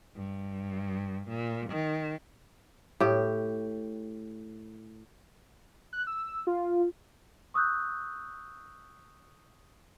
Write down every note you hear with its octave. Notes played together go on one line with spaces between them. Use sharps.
G2
A#2
D#3
A2 G4
F#6
E6
F4
C#6 D#6 E6 F#6 G6